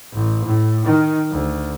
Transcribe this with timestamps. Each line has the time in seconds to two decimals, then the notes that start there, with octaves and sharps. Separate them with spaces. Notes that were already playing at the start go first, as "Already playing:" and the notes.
0.13 A1
0.45 A2
0.85 D#3
1.31 D2